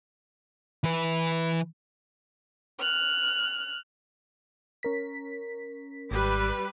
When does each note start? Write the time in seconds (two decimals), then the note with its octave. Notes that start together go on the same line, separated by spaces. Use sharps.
0.84 E3 B4
2.80 F6 F#6
4.83 C#4 A#4 B6
6.11 G#1 G3 B4